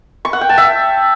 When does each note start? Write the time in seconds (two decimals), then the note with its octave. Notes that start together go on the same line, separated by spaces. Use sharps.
0.25 C#6
0.33 F#5
0.41 G5
0.49 A5
0.58 E5